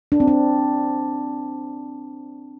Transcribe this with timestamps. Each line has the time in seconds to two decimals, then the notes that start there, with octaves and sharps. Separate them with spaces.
0.12 D4
0.20 C4
0.28 D4